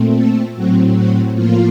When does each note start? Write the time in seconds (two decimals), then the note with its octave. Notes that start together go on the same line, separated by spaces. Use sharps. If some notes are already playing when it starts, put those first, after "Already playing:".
Already playing: A#2 A3 C4
0.15 A4
0.55 A2 F#3 C4 F#4
0.95 F#4
1.34 A2 F3 A#3 F4